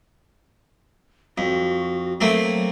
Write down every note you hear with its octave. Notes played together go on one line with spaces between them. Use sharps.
F2 F#4
F#3 A3 A#3 C4